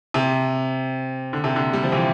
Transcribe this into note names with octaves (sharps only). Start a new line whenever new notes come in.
C3
D3
C3
D3
G3
F3
C3 E3